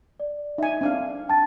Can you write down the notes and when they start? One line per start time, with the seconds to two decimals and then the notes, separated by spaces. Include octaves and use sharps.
0.20 D5
0.58 D#4 E5 G#5
0.81 C4 D4 F5
1.29 G5 A5 A6